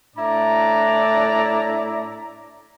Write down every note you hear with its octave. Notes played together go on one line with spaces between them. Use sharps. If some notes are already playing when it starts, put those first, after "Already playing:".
A2 D4 E4 D5 A#5